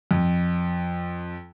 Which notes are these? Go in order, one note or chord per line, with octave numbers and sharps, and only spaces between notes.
F2